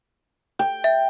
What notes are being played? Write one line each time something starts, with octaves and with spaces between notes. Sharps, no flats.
G5
E5